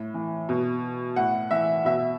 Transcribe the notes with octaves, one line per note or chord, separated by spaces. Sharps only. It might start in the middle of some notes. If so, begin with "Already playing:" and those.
Already playing: A2
E3
B2
A2 F#5
E3 E5
B2 E5